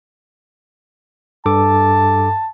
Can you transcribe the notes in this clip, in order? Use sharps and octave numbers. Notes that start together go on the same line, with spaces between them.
G2 A4 A5 D6